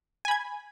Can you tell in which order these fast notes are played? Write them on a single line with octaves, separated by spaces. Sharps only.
G#5 B5 G#6